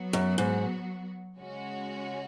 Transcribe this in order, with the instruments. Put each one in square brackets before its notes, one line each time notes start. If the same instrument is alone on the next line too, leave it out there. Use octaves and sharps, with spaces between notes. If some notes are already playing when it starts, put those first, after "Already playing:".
Already playing: [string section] F#3 B3 F#4
[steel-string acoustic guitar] F#2
G#2
[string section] C#3 G#3 C#4 F#4